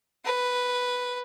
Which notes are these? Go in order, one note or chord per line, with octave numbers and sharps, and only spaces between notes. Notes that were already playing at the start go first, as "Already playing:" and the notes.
B4